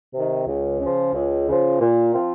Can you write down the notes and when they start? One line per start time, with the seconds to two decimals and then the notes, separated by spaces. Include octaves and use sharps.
0.13 C3
0.19 D#3
0.47 C#2
0.80 C#3 F3
1.14 C#2
1.48 C#3 F3
1.80 A#2
2.13 F3 C4 F4